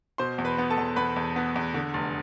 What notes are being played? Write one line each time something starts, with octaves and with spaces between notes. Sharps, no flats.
B2 C5 C6
E2
B4 B5
B3
A4 A5
E2
E2 B4 B5
E2
B3
E2
D3
F1